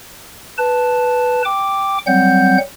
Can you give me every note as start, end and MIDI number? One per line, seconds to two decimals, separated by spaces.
0.58 1.42 71
0.58 1.42 81
1.45 1.98 79
1.45 1.98 86
2.07 2.58 54
2.07 2.58 55
2.07 2.58 60
2.07 2.58 78
2.07 2.58 91